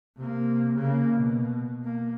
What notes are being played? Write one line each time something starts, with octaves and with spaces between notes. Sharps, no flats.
C3 A#3
C#3 A#3
B2
A#3